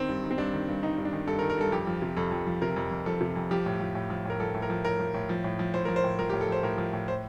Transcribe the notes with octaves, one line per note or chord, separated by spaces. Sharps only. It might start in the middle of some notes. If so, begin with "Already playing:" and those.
Already playing: D#3 C4
G2
D#3
C4
G2 D4
D#3
G2
D#3 D#4
G2
D4
D#3
G2 A4
A#4
D#3
A#4
G2 A4
F2 G4
F3
C3
F2 A4
F2
F3
C3 A#4
F2
F2
F3 A4
C3
F2
F3 G4
A2
F3
A2
F3
A2 A#4
F3 A4
A2
A#4
F3
A2 A#4
F3
A2
F3
A2
F3
A2 C5
F3 A#4
C5
A2
F3 A#4
G4
A2
A4
F3 C5
A2 A#4
F3
A2
C5